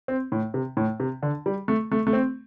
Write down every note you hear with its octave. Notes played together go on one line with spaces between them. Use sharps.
C4
A2
C3
A2
C3
D3
G3
A3
A3
A3
C4